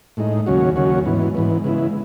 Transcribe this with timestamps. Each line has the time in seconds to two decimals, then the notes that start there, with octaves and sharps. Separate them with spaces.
0.17 A2 G#3 D#4
0.46 D#2 C#3 F#3 C#4 F#4
0.76 D#2 C#3 F#3 C#4 F#4
1.06 G#2 E3 B3
1.35 G#2 E3 B3
1.64 C#3 G#3 B3 E4